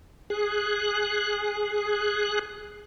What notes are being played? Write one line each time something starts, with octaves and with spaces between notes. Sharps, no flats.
G#4 F#6